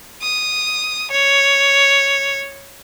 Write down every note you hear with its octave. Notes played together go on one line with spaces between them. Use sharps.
D#6
C#5